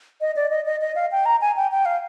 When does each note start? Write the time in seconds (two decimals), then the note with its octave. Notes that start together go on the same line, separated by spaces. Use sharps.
0.21 D#5
0.36 D5
0.50 D#5
0.65 D#5
0.81 D#5
0.95 F5
1.11 G5
1.25 A#5
1.41 G#5
1.56 G5
1.71 G5
1.85 F5